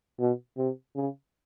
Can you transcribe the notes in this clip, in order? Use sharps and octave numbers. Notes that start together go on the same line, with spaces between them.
B2
C3
C#3